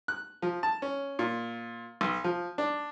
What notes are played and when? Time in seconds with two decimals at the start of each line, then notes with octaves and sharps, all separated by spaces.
0.08 F#6
0.42 F3
0.63 A5
0.82 C#4
1.19 A#2
2.01 B1
2.24 F3
2.58 D4